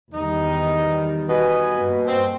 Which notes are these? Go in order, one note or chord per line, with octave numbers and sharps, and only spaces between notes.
E2 D#3 G3 D#4
B2 B4 D#5 G#5
G2 A#3
C4